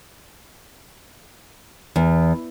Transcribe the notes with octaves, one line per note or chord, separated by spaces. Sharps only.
E2